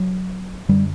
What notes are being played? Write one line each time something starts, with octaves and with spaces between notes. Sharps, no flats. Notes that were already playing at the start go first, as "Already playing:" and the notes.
Already playing: F#3
F#2 D3 G3